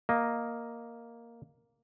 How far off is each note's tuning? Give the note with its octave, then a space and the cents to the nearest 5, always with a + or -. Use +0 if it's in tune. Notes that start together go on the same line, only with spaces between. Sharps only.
A#3 +0 D#5 +0